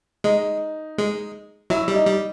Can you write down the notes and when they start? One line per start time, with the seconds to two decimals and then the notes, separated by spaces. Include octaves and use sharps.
0.24 G#3 D#4
0.98 G#3
1.70 F#3 E4
1.88 G3
1.94 D#4
2.06 G3